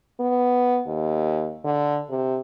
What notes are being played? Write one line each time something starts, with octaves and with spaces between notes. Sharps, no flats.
B3
D#2
D3
C3